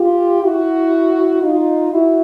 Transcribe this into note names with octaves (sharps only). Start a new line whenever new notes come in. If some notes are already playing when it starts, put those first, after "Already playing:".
Already playing: F4 G4
E4 F#4
D#4 F4
E4 F#4